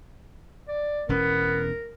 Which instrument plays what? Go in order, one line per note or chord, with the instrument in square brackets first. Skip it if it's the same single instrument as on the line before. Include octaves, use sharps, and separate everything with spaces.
[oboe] D5
[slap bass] E1 E2 C#4 [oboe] B3 [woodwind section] A#4